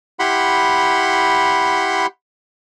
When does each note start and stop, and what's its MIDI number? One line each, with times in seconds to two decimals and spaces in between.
0.19 2.06 64
0.19 2.06 67
0.19 2.06 78
0.19 2.06 83
0.19 2.06 84